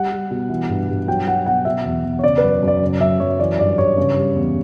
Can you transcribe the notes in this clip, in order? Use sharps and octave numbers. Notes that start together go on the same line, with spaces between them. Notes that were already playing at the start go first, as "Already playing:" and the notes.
Already playing: G3 F#5
G3
B2
E3
G2
G2
F#3 G5
F#3 F#5
B2 F#5
B2 E5
E2
E2
C#5
C#3 D5
B4
F#2
F#2 D5
C#3
F#2 E5
F#2 C#5
E3 D5
G2 D5
G2 C#5
C#3
G3
E2